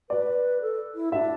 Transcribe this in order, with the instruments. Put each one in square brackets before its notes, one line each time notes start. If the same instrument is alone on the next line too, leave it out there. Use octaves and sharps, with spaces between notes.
[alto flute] B4 [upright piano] D5
[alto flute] A4
E4
[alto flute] D4 [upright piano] E5